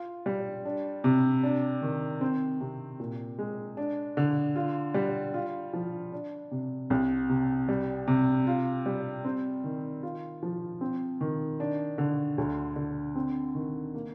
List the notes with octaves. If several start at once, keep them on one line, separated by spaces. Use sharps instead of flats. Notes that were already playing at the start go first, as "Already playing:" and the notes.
Already playing: F4
G3
D4
C3
D4
D#3
C4
C3
A#2
G#3
D4
D3
F4
G3
F4
F3
D4
C3
C2
C3
G3
C3
F4
G3
C4
D#3
F4
F3
C4
D#3
D4
D3
D2
D3
C4
D#3
A#3